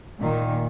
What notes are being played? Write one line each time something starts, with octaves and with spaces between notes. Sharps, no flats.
A#2 D#3